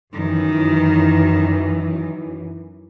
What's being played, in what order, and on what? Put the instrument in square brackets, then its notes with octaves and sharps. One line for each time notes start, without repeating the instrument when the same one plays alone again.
[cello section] F#2 E3 [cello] D#3